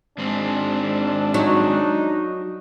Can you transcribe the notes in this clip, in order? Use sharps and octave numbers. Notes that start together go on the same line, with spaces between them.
G#2 C4 D4
F#3 D#4